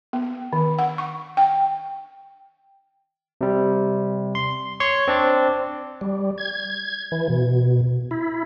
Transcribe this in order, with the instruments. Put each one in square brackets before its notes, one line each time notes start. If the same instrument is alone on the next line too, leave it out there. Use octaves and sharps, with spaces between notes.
[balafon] B3
D#3
F#5
C#6
G5
[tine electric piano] C3 G3
C6
C#5 C6 C#6
C4 D4 D5
[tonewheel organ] G3
G#6
E3
B2
E4